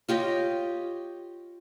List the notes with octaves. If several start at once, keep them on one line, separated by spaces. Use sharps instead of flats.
F4 G4 C#5 D#5